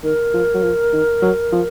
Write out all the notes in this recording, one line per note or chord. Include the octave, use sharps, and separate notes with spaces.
D#3 A#4
F3
F#3
F3
D#3
F#3
F3